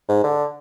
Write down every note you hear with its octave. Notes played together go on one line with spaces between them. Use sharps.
G#2
D3